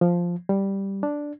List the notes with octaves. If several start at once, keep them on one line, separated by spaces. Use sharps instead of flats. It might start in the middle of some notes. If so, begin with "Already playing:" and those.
F3
G3
D4